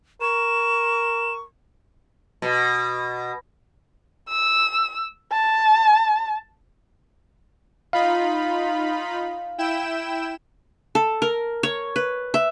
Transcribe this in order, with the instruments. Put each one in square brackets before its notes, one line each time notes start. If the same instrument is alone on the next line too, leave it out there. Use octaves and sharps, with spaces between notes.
[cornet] A#4 [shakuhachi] C#6 [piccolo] E7
[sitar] B2
[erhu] E6
A5
[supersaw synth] D#4 F4 B5 [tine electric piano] F5
[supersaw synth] E4 G5 E7
[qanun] A4
A#4
C#5
B4
E5